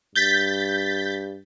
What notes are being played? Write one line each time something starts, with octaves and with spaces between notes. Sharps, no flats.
G2 G6 A6 B6